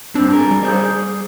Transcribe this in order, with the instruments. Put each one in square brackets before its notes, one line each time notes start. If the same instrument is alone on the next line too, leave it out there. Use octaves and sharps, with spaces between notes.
[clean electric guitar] G2 C4 [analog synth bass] D4
[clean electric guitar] G#4 A#4
[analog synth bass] G3
[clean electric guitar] G#4 C5 D5
G#4